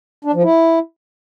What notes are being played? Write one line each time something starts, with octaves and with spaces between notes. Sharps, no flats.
D4
F3
E4